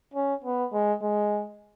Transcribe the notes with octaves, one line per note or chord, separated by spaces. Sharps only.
C#4
B3
G#3
G#3